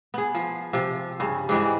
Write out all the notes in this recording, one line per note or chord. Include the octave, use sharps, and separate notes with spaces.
B3 G#4
F3
C3 F3
G2 C#3
G#2 E3 G3 G#3